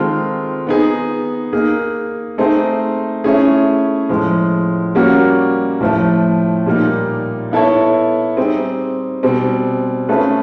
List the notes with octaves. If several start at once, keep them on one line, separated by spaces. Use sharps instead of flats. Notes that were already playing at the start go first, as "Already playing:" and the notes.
Already playing: D#3 G#3 C4 F4 A4
B3 D#4 G#4
A#3 D#4 G#4
A3 C4 D#4 G#4 C5
A3 C#4 E4 G#4
A2 F3 G#3
G3 A#3 C#4 F#4
A2 F3 A3
A#2 G3 A#3 D#4
B3 E4 A4 C#5
G3 C4 D#4 G#4
B2 G3 C4
A3 C#4 F4 G#4 B4